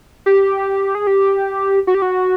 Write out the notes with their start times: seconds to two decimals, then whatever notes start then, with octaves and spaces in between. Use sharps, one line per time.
0.26 G4
0.95 G#4
1.07 G4
1.87 F#4
1.95 G4
2.02 F#4